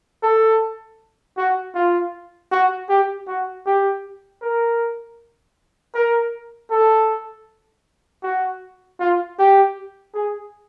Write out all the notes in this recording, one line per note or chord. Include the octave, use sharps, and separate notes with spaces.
A4
F#4
F4
F#4
G4
F#4
G4
A#4
A#4
A4
F#4
F4
G4
G#4